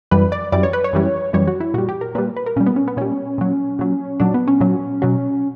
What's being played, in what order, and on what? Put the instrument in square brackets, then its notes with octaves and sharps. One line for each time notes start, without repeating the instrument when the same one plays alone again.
[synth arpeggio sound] F#2 E3 G3 B4
D5
F#2 E3 G3 D5
C#5
B4
C#5
F#2 E3 G3
F#2 E3 G3 C#5
F#4
E4
A#2 G3 F#4
G4
A#4
A#2 G3 B4
B4
A#4
A#2 G3 C#4
B3
C#4
B3
A#2 G3 C#4
A#2 F#3
A#2 F#3
A#2 F#3 D4
B3
C#4
A#2 F#3
B2 F#3